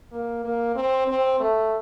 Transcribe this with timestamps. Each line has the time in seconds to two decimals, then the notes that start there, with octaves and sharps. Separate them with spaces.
0.11 A#3
0.44 A#3
0.75 C4
1.08 C4
1.40 A3